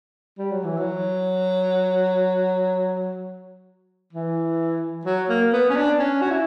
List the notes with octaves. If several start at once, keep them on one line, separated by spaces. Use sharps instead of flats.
G3
F#3
E3
F#3
E3
F#3
A#3
B3
C#4
D4
C#4
F#4
E4